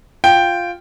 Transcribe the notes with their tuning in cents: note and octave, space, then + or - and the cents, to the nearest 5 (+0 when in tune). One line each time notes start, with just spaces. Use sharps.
F4 +0 G5 +0